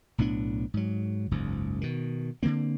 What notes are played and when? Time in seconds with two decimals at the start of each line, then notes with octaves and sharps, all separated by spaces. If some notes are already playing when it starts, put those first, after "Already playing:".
0.18 B1 A2 B3 D4
0.74 G#2 F#3
1.31 F#1 C#2 G#2
1.81 B2 D#3
2.43 D3 F3 A#3 C4